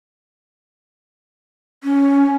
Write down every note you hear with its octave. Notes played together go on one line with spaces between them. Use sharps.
C#4